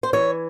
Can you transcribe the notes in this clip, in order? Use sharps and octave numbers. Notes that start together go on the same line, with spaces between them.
C5
E3 C#5